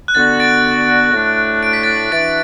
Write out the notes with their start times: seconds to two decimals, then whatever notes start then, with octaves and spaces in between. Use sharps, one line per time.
0.08 F#6
0.15 D3 B3 F#4 A6
0.40 A6 D7
1.13 A2 A3 D4 F#4
1.63 D7
1.73 B6
1.83 A6 D7
2.12 E3 D4 F#4 A6 D7